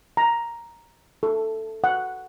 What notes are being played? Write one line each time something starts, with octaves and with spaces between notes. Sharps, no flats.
A#5
A4
F#5